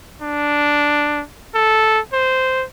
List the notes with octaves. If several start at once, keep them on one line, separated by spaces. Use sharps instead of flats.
D4
A4
C5